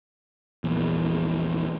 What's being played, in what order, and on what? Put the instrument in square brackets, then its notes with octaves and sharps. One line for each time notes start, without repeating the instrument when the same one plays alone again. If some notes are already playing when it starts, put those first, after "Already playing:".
[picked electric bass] A#1 E2